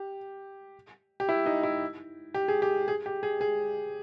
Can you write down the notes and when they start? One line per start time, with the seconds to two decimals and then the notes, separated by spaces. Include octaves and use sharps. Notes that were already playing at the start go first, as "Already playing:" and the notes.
Already playing: G4
1.20 G4
1.29 E4
1.46 D#4
1.63 E4
2.34 G4
2.48 G#4
2.62 G4
2.88 G#4
3.06 G4
3.23 G#4
3.41 G#4